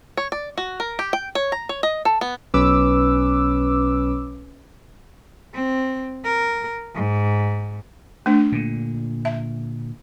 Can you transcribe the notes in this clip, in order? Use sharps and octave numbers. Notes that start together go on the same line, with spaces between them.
C#5
D5
F#4
A#4
G4
G5
C#5
A#5
C#5
D#5
A4
B3
B1 C#4 B4 D6 E6
C4
A#4
G#2
A3 D4
A#2 D3
E5